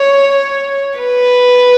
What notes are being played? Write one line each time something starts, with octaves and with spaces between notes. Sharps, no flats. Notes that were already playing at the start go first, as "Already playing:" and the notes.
Already playing: C#5
B4